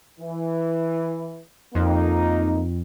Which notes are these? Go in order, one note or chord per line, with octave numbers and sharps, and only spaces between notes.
E3
F2 A#3 D#4